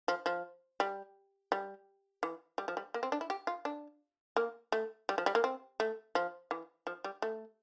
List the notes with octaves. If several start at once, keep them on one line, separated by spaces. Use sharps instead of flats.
F3
F3
G3
G3
E3
G3
F3
G3
A#3
C4
D4
E4
G4
F4
D4
A#3
A3
G3
F3
G3
A#3
C4
A3
F3
E3
F3
G3
A3